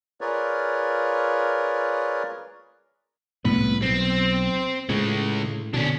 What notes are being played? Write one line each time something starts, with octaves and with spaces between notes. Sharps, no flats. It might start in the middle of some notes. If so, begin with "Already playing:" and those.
F4 G#4 A#4 B4 C#5 D5
C2 A2 B3 B4
B1 C4
A2 C#3 G#3
B2 D3 C#4 D4